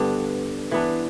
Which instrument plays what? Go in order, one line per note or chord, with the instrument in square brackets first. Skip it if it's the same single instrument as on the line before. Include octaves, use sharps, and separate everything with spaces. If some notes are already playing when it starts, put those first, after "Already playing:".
Already playing: [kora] G2 D3 B3 D4
E3 B3 D4